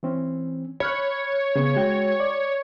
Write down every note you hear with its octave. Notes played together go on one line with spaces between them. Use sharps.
E3 C4 C#4
C#5 B5 F6 F#6
C#3 B3
G#3 F#4 G5
D5